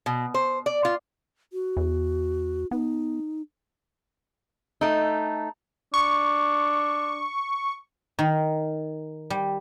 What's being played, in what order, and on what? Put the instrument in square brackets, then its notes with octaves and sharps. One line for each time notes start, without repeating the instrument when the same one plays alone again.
[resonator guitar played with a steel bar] B2
C5
D5
F4
[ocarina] F#4
[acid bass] E2
[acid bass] B3 [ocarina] D#4
[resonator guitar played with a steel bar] A3 D#4
[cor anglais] D4 [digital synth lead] C#6
[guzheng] D#3
G3